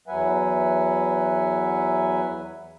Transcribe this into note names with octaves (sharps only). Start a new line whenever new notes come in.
E2 F#3 B4 E5 F#5 G#5